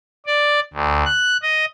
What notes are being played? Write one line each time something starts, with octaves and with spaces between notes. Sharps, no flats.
D5
D2
F#6
D#5